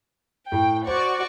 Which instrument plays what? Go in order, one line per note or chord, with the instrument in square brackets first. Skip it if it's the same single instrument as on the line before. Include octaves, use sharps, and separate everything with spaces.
[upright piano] A2 [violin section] G5
[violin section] F#4 D5 C#6 [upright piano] C5